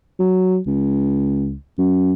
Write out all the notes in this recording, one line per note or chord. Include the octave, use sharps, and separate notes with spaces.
F#3
C#2
F#2